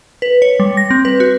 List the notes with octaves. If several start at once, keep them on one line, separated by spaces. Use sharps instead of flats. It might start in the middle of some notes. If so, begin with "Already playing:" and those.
B4
C#5
G3
A#6
C4
B4
F#4